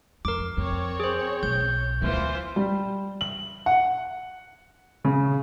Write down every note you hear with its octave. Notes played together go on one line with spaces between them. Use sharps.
F2 A#4 D6
F2 C4 C#5
G#4 C5
B1 G6
D2 E3 B3 F4 C5
G3
F#7
F#5
C#3